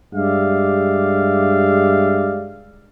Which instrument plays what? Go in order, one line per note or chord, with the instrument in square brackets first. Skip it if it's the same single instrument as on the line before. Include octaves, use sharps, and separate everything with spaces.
[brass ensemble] G2 G#3 G4 D5 E5 F5